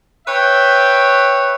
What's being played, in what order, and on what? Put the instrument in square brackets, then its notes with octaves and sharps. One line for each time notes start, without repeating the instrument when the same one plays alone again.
[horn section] B4 C#5 E5 G5